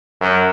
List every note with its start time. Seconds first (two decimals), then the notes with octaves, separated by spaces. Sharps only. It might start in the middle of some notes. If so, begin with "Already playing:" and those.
0.21 F#2